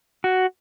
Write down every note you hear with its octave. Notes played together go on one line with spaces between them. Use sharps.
F#4